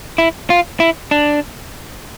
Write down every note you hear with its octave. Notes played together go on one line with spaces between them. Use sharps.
E4
F4
E4
D4